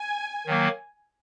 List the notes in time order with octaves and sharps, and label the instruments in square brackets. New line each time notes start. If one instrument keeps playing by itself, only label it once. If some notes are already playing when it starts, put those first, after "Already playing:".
Already playing: [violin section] G#5
[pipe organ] D#3 F#3 A#3